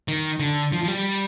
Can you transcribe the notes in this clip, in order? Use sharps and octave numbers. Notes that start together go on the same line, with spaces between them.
D#3
D3
F3
F3
G3